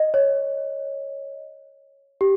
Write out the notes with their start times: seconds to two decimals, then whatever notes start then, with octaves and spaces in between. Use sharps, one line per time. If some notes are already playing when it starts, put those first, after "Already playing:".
Already playing: D#5
0.14 C#5
2.21 G4